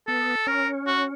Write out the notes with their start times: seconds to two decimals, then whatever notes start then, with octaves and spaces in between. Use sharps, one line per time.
0.07 B3 A4
0.47 C#4 A#4
0.87 F#4